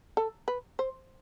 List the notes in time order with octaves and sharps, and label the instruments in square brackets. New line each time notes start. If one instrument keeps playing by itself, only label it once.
[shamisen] A4
B4
C5